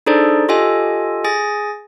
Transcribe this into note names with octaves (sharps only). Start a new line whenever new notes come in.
D4 D#4 G#4 A4 C5 D5
F4 G4 A4 D#5 G#5
G#4 G#5 A6 A#6